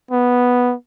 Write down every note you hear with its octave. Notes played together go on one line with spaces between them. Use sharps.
B3